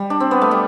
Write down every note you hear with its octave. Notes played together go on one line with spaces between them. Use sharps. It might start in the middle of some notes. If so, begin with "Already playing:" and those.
Already playing: G3
D4
C4
B3
A3
G3